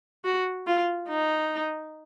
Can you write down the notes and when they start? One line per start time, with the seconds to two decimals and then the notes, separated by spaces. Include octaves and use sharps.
0.25 F#4
0.67 F4
1.09 D#4